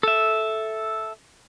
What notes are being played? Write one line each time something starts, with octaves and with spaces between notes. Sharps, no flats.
A4 E5